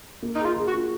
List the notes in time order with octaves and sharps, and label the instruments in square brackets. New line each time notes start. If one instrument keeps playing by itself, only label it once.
[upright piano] A#3
[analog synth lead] D#4 [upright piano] G#4
[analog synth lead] F4
[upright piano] G#4
[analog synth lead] F#4
[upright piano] F4